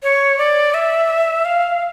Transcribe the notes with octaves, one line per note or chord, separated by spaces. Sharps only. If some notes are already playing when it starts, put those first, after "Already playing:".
C#5
D5
E5
F5